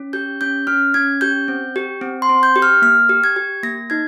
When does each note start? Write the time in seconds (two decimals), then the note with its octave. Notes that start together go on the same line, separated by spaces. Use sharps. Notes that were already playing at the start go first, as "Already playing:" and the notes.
Already playing: C#4
0.13 G4 G6
0.41 C#4 G6
0.67 C#4 F6
0.94 C#4 G#6
1.21 G4 G6
1.48 C4
1.76 G4
2.01 C4
2.22 C6
2.29 C4
2.43 G6
2.56 G4
2.62 F6
2.82 A#3 F6
3.09 G4
3.24 G#6
3.36 G4
3.63 A#3 A#6
3.90 D#4 G#6